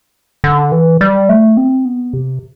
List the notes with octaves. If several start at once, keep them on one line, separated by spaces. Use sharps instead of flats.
D3
E3
G3
A3
C4
B3
C3